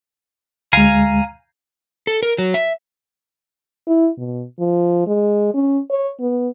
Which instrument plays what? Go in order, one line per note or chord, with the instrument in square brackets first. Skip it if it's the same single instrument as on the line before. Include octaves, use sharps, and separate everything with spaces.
[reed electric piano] D2 G#3 [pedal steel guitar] F5 G#5 A#5
[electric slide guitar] A4
A#4
F#3
E5
[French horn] E4
B2
F3
G#3
C#4
C#5
B3